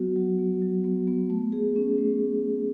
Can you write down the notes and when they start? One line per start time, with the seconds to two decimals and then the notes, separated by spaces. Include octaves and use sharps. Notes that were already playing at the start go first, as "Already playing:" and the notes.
Already playing: F#3 B3 F#4
0.16 F#3
0.39 B3
0.62 F#3
0.84 B3
1.07 B3
1.30 A3
1.52 G#4
1.76 C#4
1.98 A3